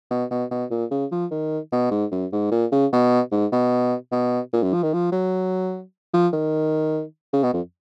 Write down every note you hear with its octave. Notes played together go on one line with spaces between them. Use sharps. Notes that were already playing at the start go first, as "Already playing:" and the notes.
B2
B2
B2
A#2
C#3
F3
D#3
B2
G#2
F#2
G#2
A#2
C#3
B2
G#2
B2
B2
A#2
F#2
F3
D#3
F3
F#3
F3
D#3
C#3
B2
F2